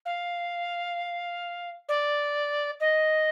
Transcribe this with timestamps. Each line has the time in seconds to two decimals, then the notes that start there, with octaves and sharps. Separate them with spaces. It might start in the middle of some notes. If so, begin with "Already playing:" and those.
0.05 F5
1.88 D5
2.80 D#5